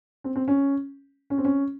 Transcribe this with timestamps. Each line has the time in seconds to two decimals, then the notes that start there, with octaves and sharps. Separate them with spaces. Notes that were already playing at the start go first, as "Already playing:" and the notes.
0.24 C4
0.36 C4
0.48 C#4
1.30 C#4
1.38 C4
1.45 C#4